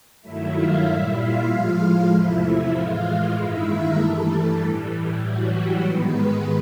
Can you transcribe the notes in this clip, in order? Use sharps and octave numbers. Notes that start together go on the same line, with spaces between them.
G2 D#3 F#3 A3 E4 E5
F4 F5
A#2 G3 E4 E5
F4 F5
A2 F3 G#3
F4 F5
E2 C3 F3 A3 E4 E5
E4 E5
A2 E3 G#3 F4 F5
G2 D#3 G#3 E4 E5
A#3 A#4
G2 E3 G3 A3 A4
A2 E3 G3
A2 E3 F#3 G3 F#4
G3 G4
G#2 D#3 G#3 B3 B4